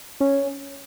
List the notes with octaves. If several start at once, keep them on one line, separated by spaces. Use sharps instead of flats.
C#4